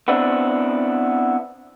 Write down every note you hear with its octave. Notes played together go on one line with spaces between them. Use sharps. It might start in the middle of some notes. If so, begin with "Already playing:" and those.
B3 C4 D4 E4